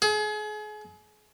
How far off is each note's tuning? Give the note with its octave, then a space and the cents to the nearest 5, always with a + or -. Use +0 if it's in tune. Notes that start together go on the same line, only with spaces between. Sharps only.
G#4 +35